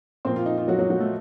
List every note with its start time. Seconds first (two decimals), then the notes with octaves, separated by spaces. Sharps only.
0.25 A#2 F3 A#3 C4 C5
0.36 F4
0.46 D#4
0.58 F4
0.68 F#3 F#4
0.79 F#3 F#4
0.90 F#3 F#4
1.00 A3 A4